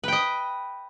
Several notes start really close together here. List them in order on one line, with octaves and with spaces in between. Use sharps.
B4 G5 D#5